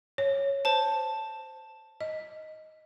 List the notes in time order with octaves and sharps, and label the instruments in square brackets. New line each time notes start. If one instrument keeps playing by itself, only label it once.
[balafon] C#5
[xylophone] C5 A5
[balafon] D#5